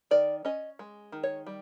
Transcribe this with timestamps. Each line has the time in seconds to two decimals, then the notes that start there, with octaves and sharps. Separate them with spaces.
0.11 D#3 D5
0.45 C#4 D#5
0.79 G#3
1.12 D#3
1.24 C#5
1.47 G3